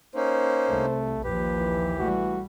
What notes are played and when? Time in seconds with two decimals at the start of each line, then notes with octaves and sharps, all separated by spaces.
0.15 A#3 C#4 D#4 C5
0.70 C2 A3
1.24 A#1 D#2 F3 G4 B4
1.57 E3
1.98 G3 A3 F#4